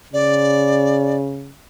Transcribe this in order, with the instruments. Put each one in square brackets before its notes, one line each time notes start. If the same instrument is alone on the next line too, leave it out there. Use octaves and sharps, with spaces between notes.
[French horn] C#3 [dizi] D5